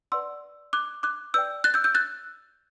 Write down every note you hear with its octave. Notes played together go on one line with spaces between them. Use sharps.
B4 D5 F#5 C6 E6
D6 F#6
D6 F#6
B4 D5 G5 E6 G6
F#6 A6
E6 G6
E6 G6
F#6 A6